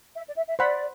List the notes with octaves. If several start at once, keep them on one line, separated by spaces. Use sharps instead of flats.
E5
D5
E5
E5
C5 D5 F#5 B5